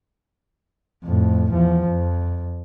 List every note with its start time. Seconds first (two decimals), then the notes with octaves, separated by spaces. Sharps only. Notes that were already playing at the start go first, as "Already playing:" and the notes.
1.05 F2 A2
1.52 E2 F3
1.89 F2